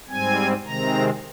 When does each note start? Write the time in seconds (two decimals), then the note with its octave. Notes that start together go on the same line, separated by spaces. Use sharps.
0.09 G#2 G3 C4 G#5
0.65 C3 D#3 G#3 C4 A#5